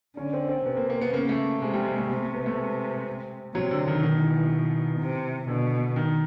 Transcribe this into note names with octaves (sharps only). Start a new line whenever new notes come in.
D3 C#4
C4
C4
C3 B3
A#3
A#3
B3
C#3 A#3
A3
C3 G#3
G3
G#3
A3
C3 A3
A3
B3
A3
G#3
C3 F#3
D3
D#3
B2 D#3
E3
E3
E3
C3
B2 D3
D#3